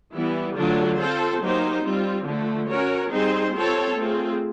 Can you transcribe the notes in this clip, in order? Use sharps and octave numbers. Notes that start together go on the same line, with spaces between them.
E3 G3 B3 E4
D3 F#3 A3 D4 F4
C4 F4 A4 C5
F#3 A#3 D#4 G4 C5
G3 C4 F4
D3 F3 A3
C#4 F#4 A#4 C#5
G3 C4 D#4 G#4 C5
C4 F4 A4 C#5
A3 C4 F4 G#4